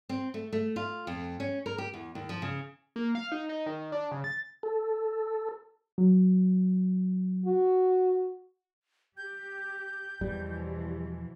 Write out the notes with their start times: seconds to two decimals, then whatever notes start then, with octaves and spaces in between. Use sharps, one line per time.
0.09 C4
0.34 A3
0.53 A3
0.76 F4
1.07 F2
1.40 C#4
1.66 A#4
1.78 G4
1.94 E2
2.15 D#2
2.29 F3
2.42 C#3
2.96 A#3
3.15 F5
3.32 D#4
3.49 D#4
3.66 D#3
3.92 D4
4.11 C#3
4.24 A6
4.63 A4
5.98 F#3
7.46 F#4
9.17 G4 G6
10.21 E2 B2 E3 F3 G3